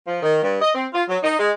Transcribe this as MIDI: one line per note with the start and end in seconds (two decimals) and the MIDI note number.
0.07 0.19 53
0.22 0.39 51
0.43 0.57 43
0.61 0.70 75
0.75 0.87 60
0.94 1.03 65
1.08 1.18 54
1.23 1.36 63
1.37 1.50 56